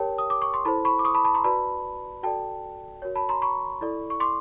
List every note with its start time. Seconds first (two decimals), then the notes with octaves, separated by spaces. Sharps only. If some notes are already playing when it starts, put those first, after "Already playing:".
Already playing: G4 A#4 C#5 G5 A5
0.18 D#6
0.30 D6
0.42 C#6
0.54 C6
0.65 E4 A4 C5 A5 B5
0.85 B5 C#6
0.99 D6
1.05 C#6 D#6
1.14 A5 B5
1.24 A5 B5
1.34 A#5 C6
1.44 F#4 B4 D5 A5 B5
2.23 F#4 A4 D5 G5 A5
3.02 F#4 A#4 C#5
3.15 A5 B5
3.29 A#5 C6
3.42 B5 C#6
3.81 E4 A4 D5
4.10 C#6
4.20 C6 D6